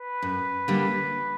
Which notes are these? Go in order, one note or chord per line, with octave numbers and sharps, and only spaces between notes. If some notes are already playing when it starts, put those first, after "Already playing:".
Already playing: B4
F#2
D3 G3 A#3 D4